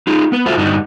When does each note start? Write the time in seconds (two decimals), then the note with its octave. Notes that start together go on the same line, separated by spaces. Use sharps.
0.07 D#4 F4 G#4
0.32 B3 B4
0.46 F4 F#4 A4 C5 E5
0.57 G2 D3 D4 D#4 F#4